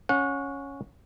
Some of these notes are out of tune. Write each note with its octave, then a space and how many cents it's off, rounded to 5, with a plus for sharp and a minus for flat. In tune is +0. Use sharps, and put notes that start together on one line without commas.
C#4 +0 F#5 -30